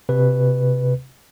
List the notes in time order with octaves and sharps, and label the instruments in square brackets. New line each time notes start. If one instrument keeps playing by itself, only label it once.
[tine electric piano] C3 B4